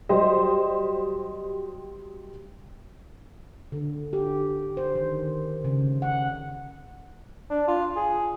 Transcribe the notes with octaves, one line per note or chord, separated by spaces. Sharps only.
F#3 G3 G4 C5 D#5
D3
G4
C5
D#3
C#3
F#5
D4
F4
G#4